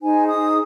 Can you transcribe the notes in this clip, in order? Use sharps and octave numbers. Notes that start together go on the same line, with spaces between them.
D#4 G#4 C5 G#5
D#6